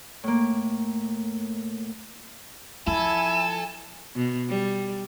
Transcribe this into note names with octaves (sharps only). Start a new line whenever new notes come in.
A2 A#3
F3 E4 A4 G#5
B2
G3